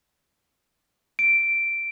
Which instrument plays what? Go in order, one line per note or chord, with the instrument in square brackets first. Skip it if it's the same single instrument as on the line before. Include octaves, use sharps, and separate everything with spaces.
[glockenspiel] D7